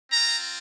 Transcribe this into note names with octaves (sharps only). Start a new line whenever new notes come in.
C4 F4 A#5